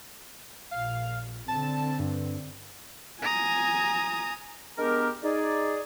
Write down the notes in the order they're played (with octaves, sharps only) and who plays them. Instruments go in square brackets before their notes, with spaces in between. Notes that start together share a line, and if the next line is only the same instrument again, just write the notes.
[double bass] A#1 A#2 [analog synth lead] F5
[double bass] D3 C4 [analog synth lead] A5
[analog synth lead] G2
[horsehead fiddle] G#5 [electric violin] A#5 D#6
[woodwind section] G#3 B3 D4 G4 A#4
D#4 G#4 D5